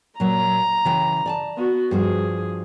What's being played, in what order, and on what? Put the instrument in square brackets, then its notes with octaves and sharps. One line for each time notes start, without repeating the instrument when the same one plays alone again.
[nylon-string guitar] A#2 F#3 [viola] A#5
[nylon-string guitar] C#3 E3 G5
D5 G#5 A5
[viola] B3 F#4
[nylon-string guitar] G2 F3 F#4 [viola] G#4